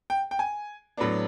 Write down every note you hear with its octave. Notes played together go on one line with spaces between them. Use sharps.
G5
G5
G#5
A2 F#3 B3 D4